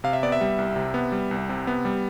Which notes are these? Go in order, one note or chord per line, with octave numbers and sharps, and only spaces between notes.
C3 F5
E5
B3 D5
E5
G3
C2
C3
B3
G3
C2
C3
B3
G3